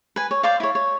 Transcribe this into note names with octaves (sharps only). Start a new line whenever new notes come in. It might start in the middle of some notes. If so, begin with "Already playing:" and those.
B4 G#5
C#5
C5 D5 F5
E4 C#5
C#5